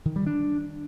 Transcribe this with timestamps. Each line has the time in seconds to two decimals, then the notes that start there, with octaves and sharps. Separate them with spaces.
0.05 D#3
0.16 G3
0.26 D4